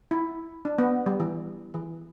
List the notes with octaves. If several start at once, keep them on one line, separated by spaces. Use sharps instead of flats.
E4
D4
B3
G3
E3
E3